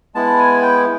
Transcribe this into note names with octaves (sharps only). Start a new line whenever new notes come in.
G#3 B3 E4 A5
G#5
G5